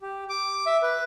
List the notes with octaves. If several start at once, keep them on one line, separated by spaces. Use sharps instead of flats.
G4
D6
E5
B4